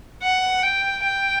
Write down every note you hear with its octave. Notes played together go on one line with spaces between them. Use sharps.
F#5
G5
G5